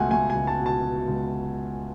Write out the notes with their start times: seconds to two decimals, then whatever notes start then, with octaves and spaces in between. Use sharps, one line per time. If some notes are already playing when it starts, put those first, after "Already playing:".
Already playing: C#2 B2 A3 F#5 G#5
0.11 A3 G#5
0.30 G#5
0.35 C#2
0.47 A5
0.60 B2
0.66 A5
0.83 B2
1.08 C#2